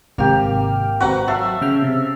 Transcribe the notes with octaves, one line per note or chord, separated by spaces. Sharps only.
G#1 C3 A#3 G4 F6
G#1 C4 F#4 B4 F#5 A#5
F#3 A4 E5 F5
C#3 G5 F6
C3